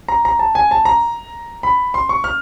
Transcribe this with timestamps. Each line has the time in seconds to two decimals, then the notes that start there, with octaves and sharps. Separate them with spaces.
0.08 A#5
0.25 A#5
0.39 A5
0.55 G#5
0.71 A5
0.85 A#5
1.63 B5
1.94 C6
2.09 C#6
2.24 F6